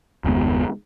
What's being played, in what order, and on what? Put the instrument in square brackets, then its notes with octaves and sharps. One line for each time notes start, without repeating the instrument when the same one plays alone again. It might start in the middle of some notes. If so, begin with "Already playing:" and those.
[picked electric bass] F#1 D#2 G#3 B3